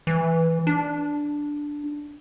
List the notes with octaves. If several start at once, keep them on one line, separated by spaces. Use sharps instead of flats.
E3
D4